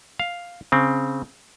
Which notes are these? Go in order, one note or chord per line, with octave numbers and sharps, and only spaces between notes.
F5
C#3 C4